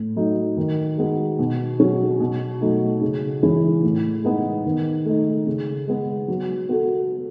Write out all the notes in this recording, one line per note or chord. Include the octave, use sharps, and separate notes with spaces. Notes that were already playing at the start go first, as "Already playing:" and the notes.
Already playing: A2
F#3 A3 D#4
D#3
G#3 B3 F#4
B2
F#3 C#4 G#4
B2
F#3 A3 D#4
C#3
E3 G#3 C#4 G#4
A2
G#3 B3 D#4 G#4
D#3
A3 D#4
C#3
G#3 B3
F#3
B3 F#4 A4